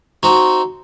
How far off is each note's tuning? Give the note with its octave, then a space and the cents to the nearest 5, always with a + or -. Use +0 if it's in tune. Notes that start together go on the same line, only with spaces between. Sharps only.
C4 +0 D#4 -5 F#4 +0